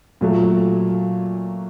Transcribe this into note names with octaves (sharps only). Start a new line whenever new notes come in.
A#2 F#3 A3